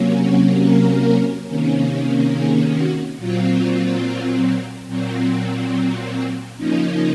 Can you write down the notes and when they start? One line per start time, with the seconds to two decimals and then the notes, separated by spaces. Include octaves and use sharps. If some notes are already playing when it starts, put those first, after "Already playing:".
Already playing: C3 F#3 A#3 C#4
0.21 F#4
0.63 A#4
1.47 C3 D#3 A#3 C#4
2.32 G#4
2.75 F#4
3.17 A#2 F#3 C4 F4
4.87 A#2 F#3 C4
6.56 C#3 F3 A#3 C#4 D#4